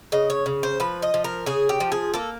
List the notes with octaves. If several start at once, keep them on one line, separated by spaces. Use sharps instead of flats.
C#3 D#5
C#5
C#3
C5
F3 B4
D#5
F3
A#4
C#3 G#4
G4
F3
G#4
A#3 A4